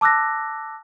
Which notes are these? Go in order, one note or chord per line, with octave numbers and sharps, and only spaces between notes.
A5 D6 E6 F#6 A#6